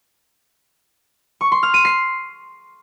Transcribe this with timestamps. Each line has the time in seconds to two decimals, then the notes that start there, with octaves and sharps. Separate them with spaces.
1.41 C#6
1.52 C6
1.63 F6
1.74 D#7
1.85 C7